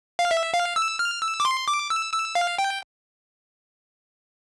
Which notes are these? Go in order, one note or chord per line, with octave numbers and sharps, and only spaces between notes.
F5
E5
F5
E6
F6
E6
D6
C6
D6
E6
E6
F5
G5